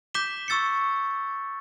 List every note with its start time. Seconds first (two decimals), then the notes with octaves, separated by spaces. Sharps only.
0.14 D6 G6 B6 E7 G7
0.48 C#6 E6 A6 C#7